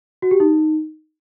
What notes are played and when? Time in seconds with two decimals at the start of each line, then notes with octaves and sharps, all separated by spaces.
0.22 F#4
0.31 G4
0.40 D#4